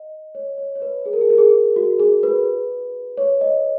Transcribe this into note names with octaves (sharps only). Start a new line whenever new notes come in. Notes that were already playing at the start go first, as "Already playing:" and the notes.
Already playing: D#5
C#5
C#5
C#5
B4
G#4
A#4
G#4
A#4
G#4
F#4
G#4
B4
C#5
D#5